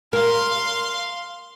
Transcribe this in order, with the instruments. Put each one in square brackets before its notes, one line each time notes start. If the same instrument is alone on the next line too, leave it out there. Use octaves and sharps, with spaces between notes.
[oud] A#4 [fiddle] F5 C6